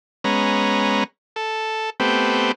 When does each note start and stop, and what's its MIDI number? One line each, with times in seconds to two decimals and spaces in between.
0.24 1.04 56
0.24 1.04 59
0.24 1.04 61
0.24 1.04 82
1.36 1.90 69
2.00 2.52 57
2.00 2.52 59
2.00 2.52 60
2.00 2.52 67